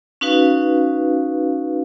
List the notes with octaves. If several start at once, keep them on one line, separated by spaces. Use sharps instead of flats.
C#4 D#4 F#4 B4 F5